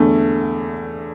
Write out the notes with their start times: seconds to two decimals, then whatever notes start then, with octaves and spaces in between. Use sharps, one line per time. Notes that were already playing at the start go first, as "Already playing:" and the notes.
Already playing: E2 D3 A3